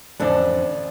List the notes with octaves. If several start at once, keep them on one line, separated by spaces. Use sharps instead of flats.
A1 F2 D3 D4 D5